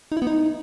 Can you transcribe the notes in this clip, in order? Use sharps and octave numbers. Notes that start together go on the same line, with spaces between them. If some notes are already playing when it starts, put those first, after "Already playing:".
D#4
E4
B3
D#4